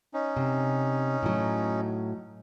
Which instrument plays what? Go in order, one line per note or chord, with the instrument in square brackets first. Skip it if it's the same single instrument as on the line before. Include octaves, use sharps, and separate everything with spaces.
[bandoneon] C#4 D#4
[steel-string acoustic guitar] C3
A2 F#3